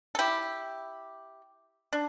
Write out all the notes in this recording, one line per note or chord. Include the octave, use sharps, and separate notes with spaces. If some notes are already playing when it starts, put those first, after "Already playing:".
A4
E4 G4
D4